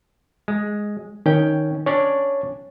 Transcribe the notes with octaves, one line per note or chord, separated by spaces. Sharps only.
G#3
D#3 C#4 G5
C#4 D4 C#5 D5